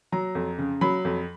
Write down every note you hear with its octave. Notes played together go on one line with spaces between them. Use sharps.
F#3 A#5
F2
C#3
F#3 B5
F2